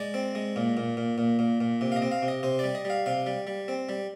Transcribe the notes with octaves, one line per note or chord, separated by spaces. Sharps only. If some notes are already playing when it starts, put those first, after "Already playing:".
Already playing: G#3 D5
C4
G#3
A#2
A#2
A#2
A#2
A#2
A#2
C3
F5
D#5
C4
F5
C3
D#5
C3 C5
G3 D5
D#5
G3 F5
C3 F5
G3
G3
C4
G3